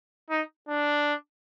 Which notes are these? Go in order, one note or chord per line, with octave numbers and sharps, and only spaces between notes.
D#4
D4